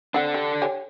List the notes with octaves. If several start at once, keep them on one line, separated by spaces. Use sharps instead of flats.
C4 D4 A4 F#5
G4
G4 C#5 G#5